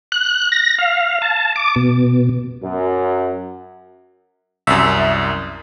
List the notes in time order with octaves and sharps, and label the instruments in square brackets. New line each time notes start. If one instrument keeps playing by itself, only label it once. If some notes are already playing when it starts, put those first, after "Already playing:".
[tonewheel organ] F#6
A#6
F5
A5
D6
B2
[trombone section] F#2
[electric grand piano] C2 F#2 [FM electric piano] E5